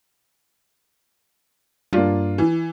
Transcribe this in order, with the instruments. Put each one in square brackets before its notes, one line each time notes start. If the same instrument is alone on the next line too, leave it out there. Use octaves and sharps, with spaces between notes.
[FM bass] G2 [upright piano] A#3 D4 F4
[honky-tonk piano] E3